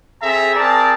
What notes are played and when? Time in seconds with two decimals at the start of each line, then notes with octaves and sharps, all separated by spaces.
0.22 C4 G#4 A4 E5 G#5 A#5
0.56 C4 G#4 A#4 D5 A5 A#5